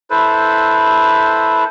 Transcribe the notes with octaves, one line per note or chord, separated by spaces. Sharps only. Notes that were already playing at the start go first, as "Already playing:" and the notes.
E4 A4 B4 C5